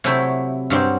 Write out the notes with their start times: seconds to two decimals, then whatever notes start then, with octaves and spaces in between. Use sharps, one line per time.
0.04 C3 F#3 A3 E4
0.70 G2 F#3 C4